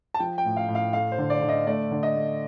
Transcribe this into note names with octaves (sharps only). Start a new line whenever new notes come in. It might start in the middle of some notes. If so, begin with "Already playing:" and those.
A5
F3 G5
G5
A2
F5
A2
F5
A3 F5
C5
D3
D5
D3
D#5
A3 D5
D3
D#5
A3